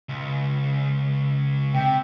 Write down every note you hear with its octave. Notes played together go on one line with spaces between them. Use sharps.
C#2
C3 G5